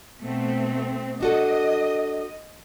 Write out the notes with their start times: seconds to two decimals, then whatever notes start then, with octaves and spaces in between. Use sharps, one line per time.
0.21 B2 A3 C4
1.21 D4 F#4 A4 D#5